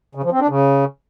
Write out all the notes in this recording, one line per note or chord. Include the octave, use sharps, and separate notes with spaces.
C#3
F3
C4
D4
C#3